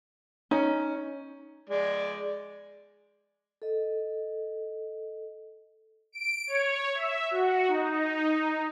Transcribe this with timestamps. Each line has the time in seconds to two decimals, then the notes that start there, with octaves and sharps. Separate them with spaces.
0.51 C#4 D#4
1.69 G#3 D5
3.62 A4 D#5
6.12 D7
6.47 C#5
6.95 E5
7.31 F#4
7.68 D#4